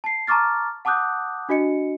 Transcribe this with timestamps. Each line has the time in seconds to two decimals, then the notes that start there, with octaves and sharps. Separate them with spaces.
0.04 A5 C7
0.27 A5 A#5 C#6 D6 F6 A6
0.85 F#5 A5 D6 D#6 F#6 G6
1.49 D4 F#4 D#5 C#7